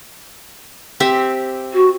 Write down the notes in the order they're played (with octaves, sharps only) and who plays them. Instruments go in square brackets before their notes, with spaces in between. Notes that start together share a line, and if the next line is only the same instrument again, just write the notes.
[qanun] C4 G4 E5
[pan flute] F#4